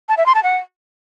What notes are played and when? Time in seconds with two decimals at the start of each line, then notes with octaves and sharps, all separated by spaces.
0.09 A5
0.17 E5
0.26 C6
0.35 A5
0.43 F#5